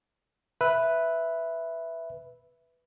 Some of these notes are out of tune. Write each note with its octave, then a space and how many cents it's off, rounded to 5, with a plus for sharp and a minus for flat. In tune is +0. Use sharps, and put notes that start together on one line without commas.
B4 +0 E5 +0